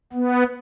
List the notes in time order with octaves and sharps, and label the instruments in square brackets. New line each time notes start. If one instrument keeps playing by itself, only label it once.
[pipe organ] B3